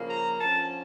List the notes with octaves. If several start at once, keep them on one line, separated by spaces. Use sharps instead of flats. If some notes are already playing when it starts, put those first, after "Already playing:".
Already playing: C#3 F3 A#3
A#5
D3 F3 C#4 A5